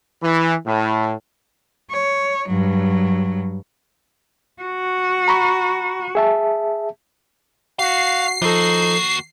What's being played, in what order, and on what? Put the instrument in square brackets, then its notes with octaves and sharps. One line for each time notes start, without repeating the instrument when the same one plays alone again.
[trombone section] E3
A2
[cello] C#5
G2 F#3
F#4
[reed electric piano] A#5 B5 C#6
G#4 E5 A5
[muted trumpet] F#4 [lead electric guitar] F5 [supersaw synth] C7
[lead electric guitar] D#2 F#4 [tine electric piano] F3 A4 [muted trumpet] D#4